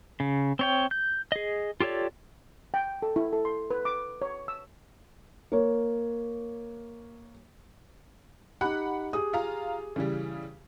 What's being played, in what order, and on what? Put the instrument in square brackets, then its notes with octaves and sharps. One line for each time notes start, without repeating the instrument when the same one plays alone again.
[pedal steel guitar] C#3
C4 C#5 G5
G6
G#4 D#5
F4 G4 A4 C#5 D5
[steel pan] G5
A4
E4
A4
C6
B4
D6
C#5
E6
[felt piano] A#3 C#5
[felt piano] D#4 G4 [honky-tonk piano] F#5 B5 F#6
[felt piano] G4 G#4 D#6
[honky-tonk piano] F4 F5 A#5
C#3 E3 G3